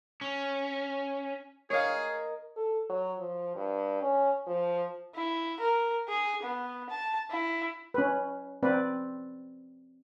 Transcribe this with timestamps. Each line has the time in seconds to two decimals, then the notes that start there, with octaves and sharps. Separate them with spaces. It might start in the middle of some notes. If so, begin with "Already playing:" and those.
0.21 C#4
1.70 G#4 A#4 C#5 D#5 F5
2.56 A4
2.89 F#3
3.19 F3
3.55 G2
4.02 C#4
4.46 F3
5.15 E4
5.60 A#4
6.08 G#4
6.43 B3
6.90 A5
7.30 E4
7.94 C#4 B4
8.63 C4 B4 D5